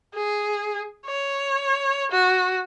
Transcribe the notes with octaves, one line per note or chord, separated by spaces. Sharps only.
G#4
C#5
F#4